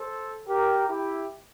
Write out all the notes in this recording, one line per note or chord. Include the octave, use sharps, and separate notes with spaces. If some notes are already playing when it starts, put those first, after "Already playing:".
Already playing: A4 C5
G4 A#4
E4 G4